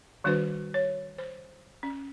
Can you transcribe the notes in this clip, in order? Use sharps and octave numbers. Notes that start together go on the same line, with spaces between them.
D#3 G3 D4 F#4 B4 C5
C#5
C5
C#4